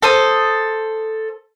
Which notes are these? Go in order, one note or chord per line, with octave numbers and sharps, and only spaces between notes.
A4 C5 D#6